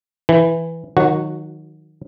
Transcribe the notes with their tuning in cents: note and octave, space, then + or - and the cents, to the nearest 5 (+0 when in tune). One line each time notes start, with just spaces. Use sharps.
E3 +0 G5 -15
D#3 +0 F#3 -30 F#4 +0